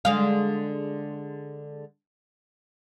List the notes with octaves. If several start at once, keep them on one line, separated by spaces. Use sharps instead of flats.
D3 G#3 F5